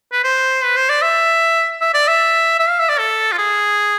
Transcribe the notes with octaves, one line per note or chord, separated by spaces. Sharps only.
B4
C5
B4
C5
D5
E5
E5
D5
E5
E5
F5
E5
D5
A4
F4
G#4